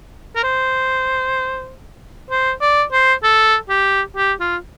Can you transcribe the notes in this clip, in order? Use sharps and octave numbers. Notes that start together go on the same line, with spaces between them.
A#4
C5
C5
D5
C5
A4
G4
G4
F4